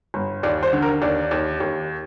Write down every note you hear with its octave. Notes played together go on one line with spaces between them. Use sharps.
G1
D#2 D5
C5
D3
A#4
D#2 D5
D#2
D#2